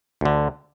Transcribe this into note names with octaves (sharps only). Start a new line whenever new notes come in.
D2 D3